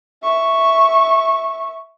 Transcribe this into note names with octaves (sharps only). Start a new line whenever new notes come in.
E5 C#6